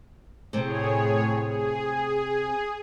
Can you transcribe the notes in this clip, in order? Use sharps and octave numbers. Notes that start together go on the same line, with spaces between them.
A2 C3 C4 G#4 C#5
G#4